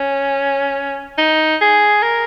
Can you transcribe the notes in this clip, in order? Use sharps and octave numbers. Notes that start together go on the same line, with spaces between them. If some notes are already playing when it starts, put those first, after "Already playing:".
Already playing: C#4
D#4
G#4
A#4